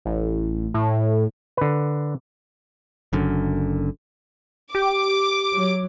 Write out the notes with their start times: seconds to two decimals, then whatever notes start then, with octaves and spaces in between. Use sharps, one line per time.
0.05 A1
0.74 A2
1.57 D3 B4
3.13 F#1 F#2 D3
4.75 G4 D6
5.53 F#3